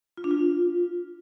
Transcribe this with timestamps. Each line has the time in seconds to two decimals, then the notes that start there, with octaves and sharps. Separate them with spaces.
0.17 F4
0.24 D4
0.31 F4